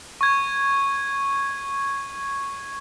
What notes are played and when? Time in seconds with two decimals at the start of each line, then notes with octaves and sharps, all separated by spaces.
0.21 C#6 G#6